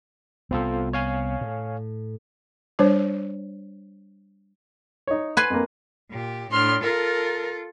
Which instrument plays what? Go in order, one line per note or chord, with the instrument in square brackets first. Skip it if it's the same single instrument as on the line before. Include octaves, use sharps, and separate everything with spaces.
[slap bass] C2 B3 [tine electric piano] C4 F4 A4
[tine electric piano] C#5 F5 G#5
[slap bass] A2
[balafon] G3 D4 C5 C#5
[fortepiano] D#4 C#5
[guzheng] B4 G#5 C6
[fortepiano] F2 A#3
[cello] A#2 G4
[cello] A2 D4 [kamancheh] C6 F6
[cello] F4 A4 [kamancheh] A#4